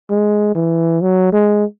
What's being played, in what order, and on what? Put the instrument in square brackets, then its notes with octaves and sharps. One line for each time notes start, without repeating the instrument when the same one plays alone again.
[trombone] G#3
E3
F#3
G#3